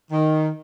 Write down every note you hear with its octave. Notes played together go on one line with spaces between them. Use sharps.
D#3